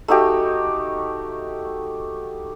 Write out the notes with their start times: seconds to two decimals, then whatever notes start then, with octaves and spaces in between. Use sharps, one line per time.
0.08 A3 D#4 F#4 G4